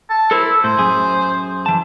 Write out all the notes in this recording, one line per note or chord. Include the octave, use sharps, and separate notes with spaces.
A5
E4 A4 A#4 C5
A2 C5
F#2 G#4
E3 A5